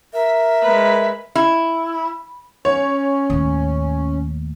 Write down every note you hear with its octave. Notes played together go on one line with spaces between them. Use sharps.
A#4 E5
G#3 B4
E4
C#4 C#5
D#2 A2